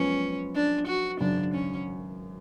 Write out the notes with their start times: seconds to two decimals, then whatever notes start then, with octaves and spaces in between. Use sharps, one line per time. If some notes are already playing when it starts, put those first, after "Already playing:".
Already playing: F#2 F3 G#3 B3 C#4
0.55 D4
0.87 F#4
1.20 G#1 F#2 C#3 F#3 D4
1.54 C#4